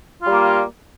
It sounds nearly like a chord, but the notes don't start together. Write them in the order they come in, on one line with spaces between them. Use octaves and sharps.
F4 G3 A#3